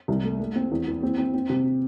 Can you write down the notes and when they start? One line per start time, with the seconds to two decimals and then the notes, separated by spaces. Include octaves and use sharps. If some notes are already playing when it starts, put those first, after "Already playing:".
0.08 C2
0.24 A3
0.39 A3
0.56 C4
0.71 E2
0.87 E3
1.03 C4
1.18 C4
1.34 C4
1.49 C3